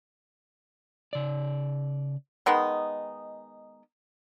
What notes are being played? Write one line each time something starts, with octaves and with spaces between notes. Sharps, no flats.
C#3 D5
D#3 G#3 B3 D#4